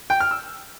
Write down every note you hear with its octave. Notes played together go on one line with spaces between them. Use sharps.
G5
F6
E6